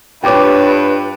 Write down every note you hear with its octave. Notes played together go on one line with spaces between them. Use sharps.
G2 F4 B4 C#5 G5 D6